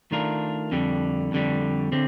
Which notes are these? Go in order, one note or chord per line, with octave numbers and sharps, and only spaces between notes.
D#3 A3 D4 F4 A#4
F2 D3 G3
F2 D3 G3
D3 C4